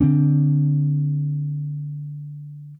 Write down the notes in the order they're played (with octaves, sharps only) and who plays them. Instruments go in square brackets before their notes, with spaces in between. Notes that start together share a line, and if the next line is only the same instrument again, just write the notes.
[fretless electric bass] D3 C4 D4